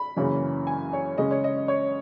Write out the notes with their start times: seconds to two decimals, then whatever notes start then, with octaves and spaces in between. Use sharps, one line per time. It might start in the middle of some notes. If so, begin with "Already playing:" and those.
Already playing: B5
0.16 F#2 C#3 E3 A#3 C#4
0.67 G#5
0.93 C#5
1.17 C#3 G#3 C#4 D#5
1.31 C#5
1.44 D#5
1.68 C#5